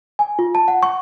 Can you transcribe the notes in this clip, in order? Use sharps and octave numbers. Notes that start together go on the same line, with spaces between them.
G#5
F4
A5
F#5
C#6